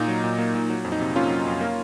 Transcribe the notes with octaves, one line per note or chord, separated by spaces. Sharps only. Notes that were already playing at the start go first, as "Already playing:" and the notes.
Already playing: A#2 A#3 D#4
F#3
A#2
A#3
A#2
F#3
F2
D#4
C3
A#3 C#4 F4
F#3
F2
A#3